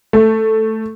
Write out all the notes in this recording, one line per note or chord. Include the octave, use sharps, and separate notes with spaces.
A3